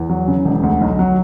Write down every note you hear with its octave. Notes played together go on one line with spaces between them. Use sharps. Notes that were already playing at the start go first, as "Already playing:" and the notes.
Already playing: E2
F#3
C#3
E1
D2
B1
F#3